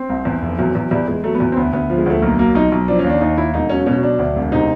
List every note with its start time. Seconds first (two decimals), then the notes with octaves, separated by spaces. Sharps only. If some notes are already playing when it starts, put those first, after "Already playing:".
Already playing: C4
0.10 C2
0.25 E2
0.42 F1
0.58 E2 F#3
0.75 E2 F#3
0.91 E2 G3
1.08 E2 G#3
1.24 F#3 A3
1.35 B3
1.40 E2
1.52 C4
1.57 D2 B3
1.73 D2 B3
1.90 F3
1.98 G#3
2.06 D2 A3
2.22 B1 A#3
2.39 F#3 A#3
2.55 B1 D#4
2.72 B1
2.88 F3 D4
2.99 C#4
3.04 D#2
3.09 D4
3.21 D#2 D#4
3.38 D#2 E4
3.54 E1 D#4
3.69 F#3 C#4
3.86 B2 C#4
4.03 F#3 D4
4.19 D2
4.36 E1
4.52 C3 D#4